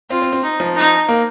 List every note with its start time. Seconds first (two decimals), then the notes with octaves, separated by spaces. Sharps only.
0.10 C4 F4
0.22 C4
0.33 C4
0.43 D#4
0.60 F3
0.75 D#4
1.09 A#3